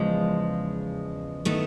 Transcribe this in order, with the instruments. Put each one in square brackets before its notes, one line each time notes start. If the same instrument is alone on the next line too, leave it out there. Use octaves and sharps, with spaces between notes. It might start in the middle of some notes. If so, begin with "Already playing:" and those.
Already playing: [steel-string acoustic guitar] E2 C#3 F3 G#3
D#3 A3 B3